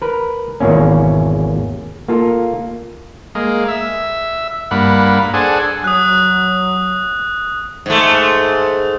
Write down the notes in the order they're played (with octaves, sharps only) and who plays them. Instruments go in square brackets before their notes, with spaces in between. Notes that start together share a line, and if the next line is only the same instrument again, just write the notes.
[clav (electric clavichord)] A#4 B4
G#1 E2 B2 A#3 C#4
A#3 F4 A4
[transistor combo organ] G#3 A#3
E5
G2 A#3 F#5 B5
D4 G#4 A4 C5 F#5 G#5
[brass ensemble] F#3 [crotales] D#6 F#6
[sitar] G#2 A3